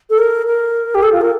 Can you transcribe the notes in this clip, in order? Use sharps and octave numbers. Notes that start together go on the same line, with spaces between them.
A4
A#4
A#4
G4
A4
F4
A#4